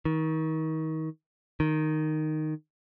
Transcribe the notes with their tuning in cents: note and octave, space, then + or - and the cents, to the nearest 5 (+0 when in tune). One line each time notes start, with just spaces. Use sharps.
D#3 +30
D#3 -5